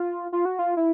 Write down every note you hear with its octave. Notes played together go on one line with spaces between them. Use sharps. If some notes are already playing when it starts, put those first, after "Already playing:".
Already playing: F4
F4
F#4
F4
E4